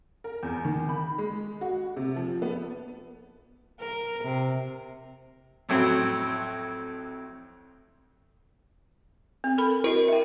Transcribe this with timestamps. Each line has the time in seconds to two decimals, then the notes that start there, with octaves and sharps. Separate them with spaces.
0.24 A#4
0.43 E2
0.65 D#3
0.89 B5
1.18 G#3
1.61 F#4
1.97 C3
2.16 F3
2.42 B3
3.80 A#4
4.24 C3
5.69 F2 A2 F#3 C4
9.44 C4
9.58 A4 A#4 B5
9.84 E4 F#4 A#4 D#5
10.08 E5 G5